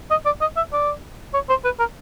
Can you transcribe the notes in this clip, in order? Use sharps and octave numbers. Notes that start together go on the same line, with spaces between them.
D#5
D5
D#5
E5
D5
C#5
C5
B4
A#4